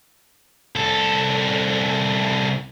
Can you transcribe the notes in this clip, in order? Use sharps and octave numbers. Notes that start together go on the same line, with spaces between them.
C2 A4